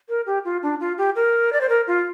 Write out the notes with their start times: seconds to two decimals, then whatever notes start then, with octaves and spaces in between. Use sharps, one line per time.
0.09 A#4
0.26 G4
0.45 F4
0.63 D4
0.80 F4
0.98 G4
1.16 A#4
1.53 D5
1.61 C5
1.69 A#4
1.87 F4